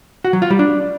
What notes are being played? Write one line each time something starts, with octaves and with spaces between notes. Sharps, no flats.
F#4
F#3
F4
G3
D4